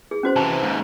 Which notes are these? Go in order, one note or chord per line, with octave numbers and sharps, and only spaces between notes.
G#4
C#4 F#4 C5
C3 E3 A5
D#2 G#2